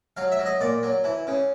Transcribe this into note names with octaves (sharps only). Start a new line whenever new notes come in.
F#3 F5
E5
F#3
D#5
A#2 D5
F#3
E3
C#3